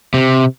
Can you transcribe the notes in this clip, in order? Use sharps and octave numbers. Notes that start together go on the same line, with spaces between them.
C3